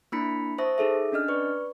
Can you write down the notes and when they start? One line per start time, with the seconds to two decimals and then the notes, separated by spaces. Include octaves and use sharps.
0.12 A#3 D4 E4 B5 B6 C#7
0.58 C5 E5 A5 C#6 D#6 A#6
0.78 D#4 G#4 A4 E5
1.12 C#4 D4 D#5 F6
1.28 B4 D5 C#6